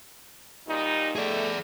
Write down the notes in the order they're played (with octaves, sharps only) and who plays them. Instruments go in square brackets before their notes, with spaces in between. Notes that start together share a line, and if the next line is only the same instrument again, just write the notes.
[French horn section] A#2 G3 D#4
[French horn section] A3 [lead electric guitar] G#4 D5